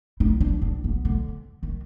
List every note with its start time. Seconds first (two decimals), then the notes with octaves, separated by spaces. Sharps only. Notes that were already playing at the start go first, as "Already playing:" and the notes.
0.20 D#4
0.41 D4
0.62 D4
0.84 B3
1.05 D3
1.63 D#3